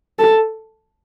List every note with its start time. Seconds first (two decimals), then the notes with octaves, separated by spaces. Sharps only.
0.19 A4